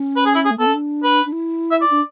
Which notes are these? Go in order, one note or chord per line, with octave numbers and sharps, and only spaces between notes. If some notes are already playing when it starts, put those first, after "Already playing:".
Already playing: C#4
B4
G#4
E4
G#4
A3
B3 A4
C#4
D4
B4
D4
E4
E5
D5
D4